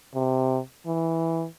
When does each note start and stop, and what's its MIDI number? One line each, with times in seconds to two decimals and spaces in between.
0.15 0.59 48
0.86 1.46 52